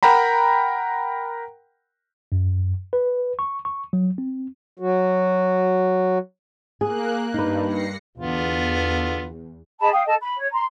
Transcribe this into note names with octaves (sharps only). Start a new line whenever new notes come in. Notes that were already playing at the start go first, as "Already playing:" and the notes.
A#4 F#5 G5 A#5 B5
F#2
B4
C#6
C#6
F#3
C4
F#3 F#4
A#3 G#4 F#6
G2 D#4 B4
A#6 C7 C#7
E2 D3 B3 F4
G#4 D#5 A5 B5
F5 G5 D#6
A4 D#5 A5
B5
C#5
A#5 C6